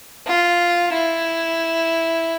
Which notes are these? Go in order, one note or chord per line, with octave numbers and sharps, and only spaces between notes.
F4
E4